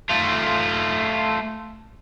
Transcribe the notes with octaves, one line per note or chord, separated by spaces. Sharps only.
A3 F4